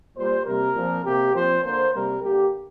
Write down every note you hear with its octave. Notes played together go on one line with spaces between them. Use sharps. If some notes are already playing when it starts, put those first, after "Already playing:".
A#2 G3 A#3 C5
C3 G3 A#3 A#4
A#2 F3 C4
C3 A#3 G4
A#2 F3 C4 C5
D3 A#3 C5
C3 G3 A#3 A#4
D3 A#3 G4